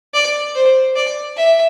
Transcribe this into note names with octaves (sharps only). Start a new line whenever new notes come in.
D5
C5
D5
E5